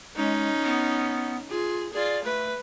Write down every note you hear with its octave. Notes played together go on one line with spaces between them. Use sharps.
G#3 C#4 D#4
B3
F4 G#4
F4 G#4 D5
A3 B4